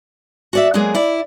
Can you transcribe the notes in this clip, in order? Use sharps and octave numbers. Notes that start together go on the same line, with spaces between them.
F#4 D5 E5
F#3 G#3 A#3 B3 G#4 A#4
E4 D5